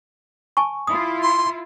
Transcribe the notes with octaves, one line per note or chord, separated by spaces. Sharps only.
G#5 A5 C#6
E4 F4 D#6
C6